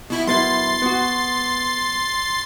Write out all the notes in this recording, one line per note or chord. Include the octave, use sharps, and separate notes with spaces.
B2 E4
F#2 B3 E4 C6 A6 C7
B3 F#4